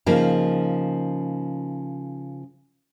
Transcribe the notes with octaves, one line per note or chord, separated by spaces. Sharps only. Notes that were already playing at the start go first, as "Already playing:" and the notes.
C#3 F3 A#3 D#4